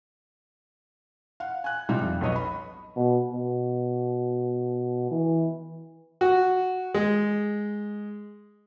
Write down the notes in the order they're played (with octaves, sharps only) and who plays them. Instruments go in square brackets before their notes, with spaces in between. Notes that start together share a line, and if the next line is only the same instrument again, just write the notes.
[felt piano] F5 F#5
G#5 F#6
C3 G3 D#4 F4
F2
B1 B4 C#5 D#5
B5
[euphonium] B2
B2
E3
[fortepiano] F#4
G#3